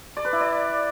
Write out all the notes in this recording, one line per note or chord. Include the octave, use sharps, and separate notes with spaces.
D5
B4
E4
D5